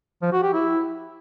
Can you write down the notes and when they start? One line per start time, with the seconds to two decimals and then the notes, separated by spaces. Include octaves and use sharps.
0.22 F3
0.33 F#4
0.43 G4
0.53 E4